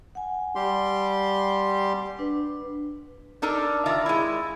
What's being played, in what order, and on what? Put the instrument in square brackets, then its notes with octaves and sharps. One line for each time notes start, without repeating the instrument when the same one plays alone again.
[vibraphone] F#5 G#5
[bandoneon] G3 G4 C6
[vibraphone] D4 B4
[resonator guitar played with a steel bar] D4 D#4 A4 A#4
D#3 F4 A#4 D5 E5
G#3 E4